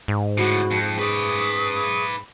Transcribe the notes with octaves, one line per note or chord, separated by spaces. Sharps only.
G#2
A2 D3 F#4 B5
F2
G#4 B4 D5 C#6 D#6